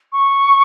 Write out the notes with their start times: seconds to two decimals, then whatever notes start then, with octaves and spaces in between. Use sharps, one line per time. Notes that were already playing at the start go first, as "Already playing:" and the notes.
0.12 C#6